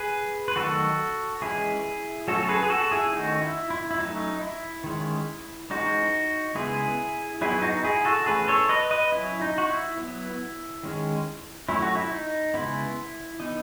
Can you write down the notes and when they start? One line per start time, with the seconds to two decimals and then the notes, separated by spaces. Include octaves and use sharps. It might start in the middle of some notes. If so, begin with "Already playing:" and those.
Already playing: G#4 B4
0.48 B4
0.56 D#3 F#3 A3 F#4 A4
1.42 E3 G#3 C#4 E4 G#4
2.28 F#3 A3 C#4 F#4 A4
2.43 A4
2.49 G#4 B4
2.63 G#4
2.70 F#4 A4
2.91 E4 G#4
3.13 D#3 A3 C#4 D#4 F#4
3.42 E4
3.70 E4
3.91 E4
3.98 F#3 A3 C#4 D#4
4.41 E4
4.84 D#3 G#3 C#4
5.70 E3 G#3 C#4 D#4 F#4
6.55 C#3 G#3 B3 E4 G#4
7.41 F#3 B3 E4 G#4
7.62 D#4 F#4
7.83 E4 G#4
8.05 F#4 A4
8.26 E3 A3 C#4 G#4 B4
8.47 A4 C#5
8.69 B4 D#5
8.91 B4 D#5
9.12 F#3 C#4 E4
9.41 D#4
9.58 F#4
9.69 E4
9.97 F#3 B3
10.83 D#3 G#3 C#4
11.69 F#3 A3 C#4 E4
11.82 F#4
11.95 E4
12.11 D#4
12.54 C#3 G#3 B3 E4
13.40 E3 B3 D#4